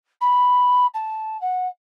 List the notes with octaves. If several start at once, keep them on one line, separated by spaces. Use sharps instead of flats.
B5
A5
F#5